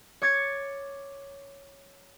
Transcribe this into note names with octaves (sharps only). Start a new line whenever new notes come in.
C#5 D6 G#6 A6 C#7